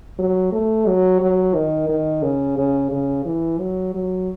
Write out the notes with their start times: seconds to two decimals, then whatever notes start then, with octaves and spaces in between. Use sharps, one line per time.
0.19 F#3
0.52 A3
0.87 F#3
1.22 F#3
1.55 D#3
1.89 D#3
2.23 C#3
2.58 C#3
2.92 C#3
3.26 E3
3.60 F#3
3.94 F#3